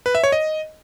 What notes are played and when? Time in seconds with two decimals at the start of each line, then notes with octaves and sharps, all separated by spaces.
0.06 B4
0.15 E5
0.24 C#5
0.32 D#5